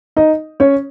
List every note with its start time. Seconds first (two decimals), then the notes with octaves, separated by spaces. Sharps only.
0.17 D#4 D#5
0.60 C#4 C#5